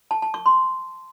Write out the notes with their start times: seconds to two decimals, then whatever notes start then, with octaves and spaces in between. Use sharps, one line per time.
0.11 A5
0.22 A5
0.34 C#6
0.46 C6